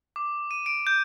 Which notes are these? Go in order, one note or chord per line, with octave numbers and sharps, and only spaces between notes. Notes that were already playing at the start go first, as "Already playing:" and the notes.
D6
D#7
D7
G6